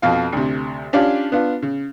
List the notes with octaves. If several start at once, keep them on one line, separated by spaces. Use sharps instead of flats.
F2 B2 F4 F5
D2 C3
C#4 D4 F4 G4 D5 F5
B3 D4 F4
C#3